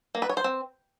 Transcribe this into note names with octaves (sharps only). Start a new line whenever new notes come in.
A#3
B4
C#5
C5
C4